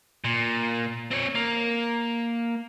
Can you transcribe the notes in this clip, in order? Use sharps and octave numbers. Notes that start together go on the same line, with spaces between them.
A#2
C4 C#5
A#3